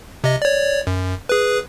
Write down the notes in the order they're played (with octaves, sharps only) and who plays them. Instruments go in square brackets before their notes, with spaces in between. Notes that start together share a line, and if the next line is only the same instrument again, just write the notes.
[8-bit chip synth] C3 D#5
C#5 D5
F#2
G#4 B4